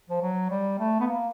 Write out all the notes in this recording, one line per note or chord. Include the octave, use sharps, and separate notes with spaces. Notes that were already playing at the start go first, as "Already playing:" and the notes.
F3
F#3
G3
A3
B3
A#3